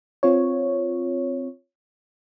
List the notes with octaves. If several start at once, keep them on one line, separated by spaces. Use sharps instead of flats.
C4 F4 C#5